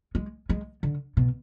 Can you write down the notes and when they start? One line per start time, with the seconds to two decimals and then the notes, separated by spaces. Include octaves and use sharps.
0.15 G#3
0.49 G#3
0.83 D3
1.17 B2